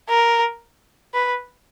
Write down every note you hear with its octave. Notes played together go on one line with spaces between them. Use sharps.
A#4
B4